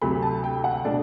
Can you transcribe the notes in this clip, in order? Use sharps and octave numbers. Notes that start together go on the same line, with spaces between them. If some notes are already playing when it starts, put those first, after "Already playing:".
D2 C3 F#3 A3 B5
A5
G5
F#5
B2 A3 D4 D5